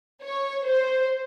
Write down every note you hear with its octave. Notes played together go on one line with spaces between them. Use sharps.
C#5
C5